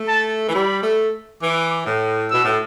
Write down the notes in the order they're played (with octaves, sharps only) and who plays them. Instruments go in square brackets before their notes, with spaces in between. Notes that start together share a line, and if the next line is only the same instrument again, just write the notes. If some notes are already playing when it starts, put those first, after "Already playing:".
Already playing: [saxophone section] A3
[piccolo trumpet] A5
[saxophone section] E3
[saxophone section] G3 [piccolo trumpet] B5
[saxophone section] A3
[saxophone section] E3 [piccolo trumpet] D6
[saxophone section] A2
[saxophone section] B2 [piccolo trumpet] E6
[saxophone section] A2